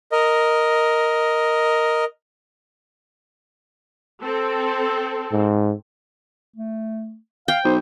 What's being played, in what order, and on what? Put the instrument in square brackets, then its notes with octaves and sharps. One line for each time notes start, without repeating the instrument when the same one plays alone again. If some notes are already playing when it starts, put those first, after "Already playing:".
[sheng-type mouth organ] A#4 D#5
[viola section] C4 A4
[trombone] G#2
[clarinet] A3
[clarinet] F5 [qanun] G5
[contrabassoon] B1 [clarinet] C5